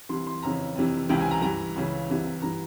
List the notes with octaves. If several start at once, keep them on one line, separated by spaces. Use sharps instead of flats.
C2 C3 E3 C6
C6
F2 C#3 E3 A#5
F2 C3 E3
C#2 C3 E3 G5
G#5
A#5
G2 E3 A#5
C#2 C#3 E3
C2 C3 E3
G2 E3 A#5